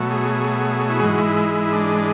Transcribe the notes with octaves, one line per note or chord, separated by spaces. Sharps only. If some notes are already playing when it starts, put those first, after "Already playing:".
Already playing: B2 F#3 A3
G#4
E4
G#2 E3 G#3 F#4
E4
E4
E4
D4